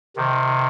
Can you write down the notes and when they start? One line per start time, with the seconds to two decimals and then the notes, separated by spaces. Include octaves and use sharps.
0.16 C3 D#3